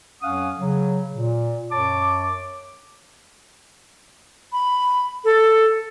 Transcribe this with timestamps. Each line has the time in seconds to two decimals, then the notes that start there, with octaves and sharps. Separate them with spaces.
0.23 F2 F#3 C#4 F5 F#5 D#6
0.58 C#3 F#3
1.13 A#2
1.71 F#2 C#5 A5 D6
4.53 B5
5.25 A4